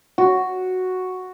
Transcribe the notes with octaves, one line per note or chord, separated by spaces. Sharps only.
F#4